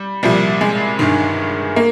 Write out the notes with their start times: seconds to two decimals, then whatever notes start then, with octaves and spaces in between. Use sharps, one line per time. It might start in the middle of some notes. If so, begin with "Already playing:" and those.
Already playing: G3
0.23 C2 A#2 F3 G3
0.61 G#3
0.99 G1 G2 D#3
1.76 A#3